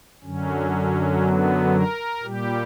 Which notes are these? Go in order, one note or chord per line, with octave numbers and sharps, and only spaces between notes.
F#2 D3 F#3 C#4
B3
A#4
A#2 G3 G4